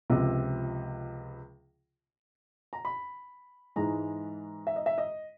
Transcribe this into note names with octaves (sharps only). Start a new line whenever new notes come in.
C#2 C3 F3
A#5
B5
G#2 E3 G#3 A#5
E5
D#5
E5
D#5